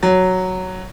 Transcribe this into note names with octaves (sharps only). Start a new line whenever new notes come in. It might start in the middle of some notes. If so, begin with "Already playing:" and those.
F#3